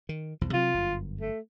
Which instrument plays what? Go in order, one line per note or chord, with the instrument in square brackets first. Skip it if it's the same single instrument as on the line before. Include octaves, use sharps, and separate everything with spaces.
[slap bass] D#3
B1 E2 F3
[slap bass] C3 F#3 C4 [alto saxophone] F4
[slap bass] G1 F#2
[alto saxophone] A3